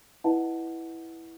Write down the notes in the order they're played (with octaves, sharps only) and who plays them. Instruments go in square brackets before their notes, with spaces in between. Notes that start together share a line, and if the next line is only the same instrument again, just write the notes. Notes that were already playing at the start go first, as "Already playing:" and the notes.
[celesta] E4 B4 D#5 F#5 A5